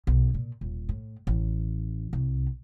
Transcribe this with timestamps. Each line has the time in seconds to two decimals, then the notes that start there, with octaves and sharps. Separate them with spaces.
0.07 B1
0.34 A#2
0.61 D#1
0.89 A2
1.27 A1
2.13 C2